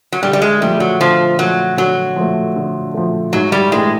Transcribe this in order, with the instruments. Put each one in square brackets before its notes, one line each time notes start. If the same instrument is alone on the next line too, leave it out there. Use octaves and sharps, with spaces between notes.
[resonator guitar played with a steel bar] F#3
[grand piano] D3 [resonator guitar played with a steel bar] G3
[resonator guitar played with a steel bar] G3
G#3
[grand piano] F3 A3 [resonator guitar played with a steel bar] G3
[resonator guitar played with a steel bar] F#3
[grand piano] D3 [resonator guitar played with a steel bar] F3
[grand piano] F3 A3 [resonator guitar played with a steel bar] F#3
[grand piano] D3 [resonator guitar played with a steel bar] F#3
[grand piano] F3 A3
D3
F3 A3
[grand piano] G#2 [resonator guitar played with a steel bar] F#3
[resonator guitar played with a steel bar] G3
[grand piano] E3 A3 D4 G4 [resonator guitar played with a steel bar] G#3